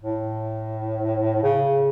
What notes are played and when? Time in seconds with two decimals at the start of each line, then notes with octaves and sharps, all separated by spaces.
0.03 A2
1.43 C#3